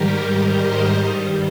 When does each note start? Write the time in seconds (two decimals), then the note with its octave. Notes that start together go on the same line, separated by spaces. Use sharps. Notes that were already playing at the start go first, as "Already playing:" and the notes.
Already playing: G#2 D#3 G3 G4 A#4
0.45 C5 D#5
0.89 G2 D#3 G3